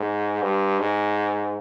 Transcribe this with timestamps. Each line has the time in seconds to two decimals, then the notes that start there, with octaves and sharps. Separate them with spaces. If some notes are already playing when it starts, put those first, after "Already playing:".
Already playing: G#2
0.42 G2
0.79 G#2